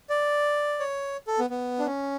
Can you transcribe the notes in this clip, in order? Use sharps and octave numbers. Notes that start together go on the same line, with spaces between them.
D5
C#5
A4
B3
B3
D4
C#4